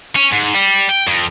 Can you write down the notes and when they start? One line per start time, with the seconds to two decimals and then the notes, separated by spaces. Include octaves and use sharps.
0.16 C#4
0.32 G#2
0.54 G3
0.89 G5
1.08 F2